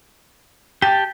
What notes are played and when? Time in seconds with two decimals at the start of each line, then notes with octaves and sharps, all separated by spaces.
0.82 G4 G5 A5